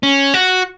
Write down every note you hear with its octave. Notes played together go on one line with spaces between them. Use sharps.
C#4
F#4